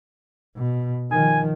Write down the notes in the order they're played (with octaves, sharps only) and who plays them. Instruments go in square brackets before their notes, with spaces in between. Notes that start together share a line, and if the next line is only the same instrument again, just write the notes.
[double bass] B2
[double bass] D#3 F3 [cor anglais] G#5